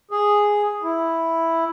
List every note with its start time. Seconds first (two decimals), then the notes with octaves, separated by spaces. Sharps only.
0.11 G#4
0.83 E4